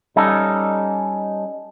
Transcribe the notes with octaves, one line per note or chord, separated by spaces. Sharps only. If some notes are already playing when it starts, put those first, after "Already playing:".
G3 C#4 D#4 A4